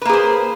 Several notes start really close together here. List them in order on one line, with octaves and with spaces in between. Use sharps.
B4 A#3 G#4 C5